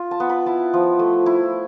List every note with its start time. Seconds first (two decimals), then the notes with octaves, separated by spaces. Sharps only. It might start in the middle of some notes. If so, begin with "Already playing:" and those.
Already playing: F4
0.11 A5
0.20 B3
0.29 B5
0.46 E4 A5
0.73 F3
0.99 A3
1.26 E4